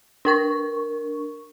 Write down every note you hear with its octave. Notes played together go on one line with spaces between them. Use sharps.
D4 A#4 C#6